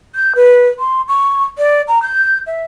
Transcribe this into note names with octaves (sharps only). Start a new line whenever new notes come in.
G6
B4
C6
C#6
D5
A#5
G6
E5